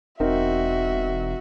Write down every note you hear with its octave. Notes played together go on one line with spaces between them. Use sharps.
E1 C4 D#4 F#4 A#4 E5